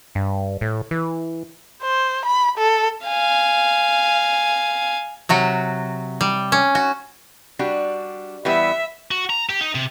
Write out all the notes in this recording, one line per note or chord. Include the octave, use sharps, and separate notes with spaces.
G2
A2
E3
C5
B5
A4
F5 G#5
C3 F#3 F#4
G3
C#4
F#4
G3 D4 F#4
E3 G3 B3 E5
F#4
A#5
G4
D#4
C3